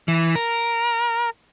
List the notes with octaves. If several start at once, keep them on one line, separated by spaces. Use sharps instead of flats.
E3
A#4